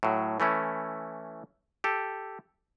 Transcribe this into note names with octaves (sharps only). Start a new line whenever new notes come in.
A2 F#3
E3 A3 C#4 E4
G4 A4